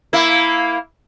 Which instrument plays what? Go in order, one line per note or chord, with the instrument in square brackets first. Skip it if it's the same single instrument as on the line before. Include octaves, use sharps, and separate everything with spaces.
[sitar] A#3 E4